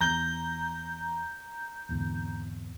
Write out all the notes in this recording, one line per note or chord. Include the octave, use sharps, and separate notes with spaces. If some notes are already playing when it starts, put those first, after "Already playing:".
E2 A#5 G6
G#1 E2 D3